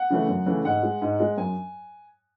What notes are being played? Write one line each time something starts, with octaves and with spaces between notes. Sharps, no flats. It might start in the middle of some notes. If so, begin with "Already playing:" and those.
Already playing: F#5
C#3 E3 A3
F#2
C#3 E3 A3
G#2 F#5
G#3
G#2
G#3
F#2 G#5